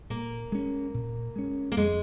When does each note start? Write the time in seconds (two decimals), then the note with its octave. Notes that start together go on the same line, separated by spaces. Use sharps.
0.10 A#2 A#3
0.52 G#3 C#4
0.94 A#2
1.36 G#3 C#4
1.72 A#3
1.77 F2 G#3